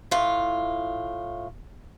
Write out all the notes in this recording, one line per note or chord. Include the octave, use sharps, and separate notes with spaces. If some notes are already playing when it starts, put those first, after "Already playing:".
A2 F4